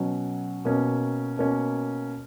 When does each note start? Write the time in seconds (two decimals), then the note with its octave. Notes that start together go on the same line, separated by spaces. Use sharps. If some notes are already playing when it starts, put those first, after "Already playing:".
Already playing: B2 F#3 C#4
0.65 B2 A#3 C#4
1.38 B2 A#3 C#4